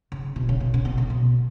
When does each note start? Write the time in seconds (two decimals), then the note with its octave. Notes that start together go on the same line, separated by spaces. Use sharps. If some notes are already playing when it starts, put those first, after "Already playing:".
0.12 C#3
0.36 B2
0.49 C#3
0.60 B2
0.74 C#3
0.85 B2
0.98 C#3
1.10 B2